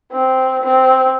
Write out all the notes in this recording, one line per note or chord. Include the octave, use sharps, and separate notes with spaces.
C4
C4